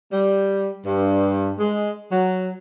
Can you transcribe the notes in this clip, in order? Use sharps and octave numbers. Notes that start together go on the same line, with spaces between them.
G3
G2
G#3
F#3